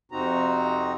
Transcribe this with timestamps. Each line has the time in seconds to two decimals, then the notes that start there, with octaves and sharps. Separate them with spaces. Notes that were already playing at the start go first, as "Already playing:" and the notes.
0.12 F2 C3 C4 D#4 F#4 A#5